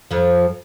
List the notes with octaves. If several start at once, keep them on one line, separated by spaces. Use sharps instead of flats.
F2 F3